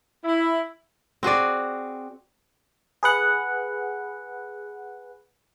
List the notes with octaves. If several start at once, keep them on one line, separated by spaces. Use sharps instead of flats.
E4
C4 F#4 G#4 D5
G#4 B4 F#5